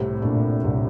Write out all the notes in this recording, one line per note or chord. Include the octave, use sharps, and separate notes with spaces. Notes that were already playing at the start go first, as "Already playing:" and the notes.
Already playing: C2 A2 C3
A#2 A3 D4
C2